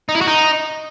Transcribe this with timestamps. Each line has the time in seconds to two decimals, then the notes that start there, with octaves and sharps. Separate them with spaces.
0.09 D#4
0.15 E4
0.21 F#4
0.27 D#4